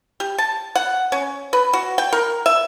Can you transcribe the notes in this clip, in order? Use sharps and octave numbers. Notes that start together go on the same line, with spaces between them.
G4
A5
F#5
C#4
B4
F#4
G5
A#4
E5